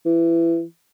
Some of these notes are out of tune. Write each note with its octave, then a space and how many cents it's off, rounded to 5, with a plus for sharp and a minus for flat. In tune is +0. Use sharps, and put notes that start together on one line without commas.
E3 +20